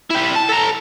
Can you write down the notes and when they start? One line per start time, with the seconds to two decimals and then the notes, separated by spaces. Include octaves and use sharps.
0.10 E4 G4
0.35 A5
0.49 A4 A#5